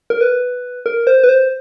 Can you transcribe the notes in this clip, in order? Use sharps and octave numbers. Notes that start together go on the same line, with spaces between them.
A#4
B4
A#4
C5
B4
C5